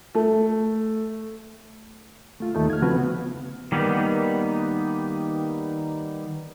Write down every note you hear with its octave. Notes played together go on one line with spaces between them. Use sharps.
A3
A3 F4
D#2 A3 D#4
F6 G#6
C#3 F3 C4 F#4 B4
B3
D#3 G3 A#3 B3 D#4